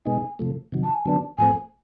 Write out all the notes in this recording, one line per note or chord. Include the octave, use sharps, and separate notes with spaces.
B2 G#3 B3 D#4 G#5
C3 F3 A3
C3 D#3 F#3
A5
G#5
D3 F#3 B3 D4 A5
A2 F3 A3 C4 G#5